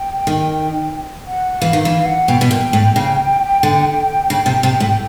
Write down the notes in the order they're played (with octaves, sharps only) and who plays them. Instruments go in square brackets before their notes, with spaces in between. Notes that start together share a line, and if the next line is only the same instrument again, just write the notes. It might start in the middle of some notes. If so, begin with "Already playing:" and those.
Already playing: [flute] G5
[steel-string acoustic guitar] D#3
[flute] F#5
[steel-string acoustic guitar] E3 [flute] F5
[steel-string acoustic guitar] D#3
[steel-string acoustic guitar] E3 [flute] F5
[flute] F#5
[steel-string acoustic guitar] B2 [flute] G5
[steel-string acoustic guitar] B2
A#2
A2
C#3
D3
C#3
C3
C3
A2
[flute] G5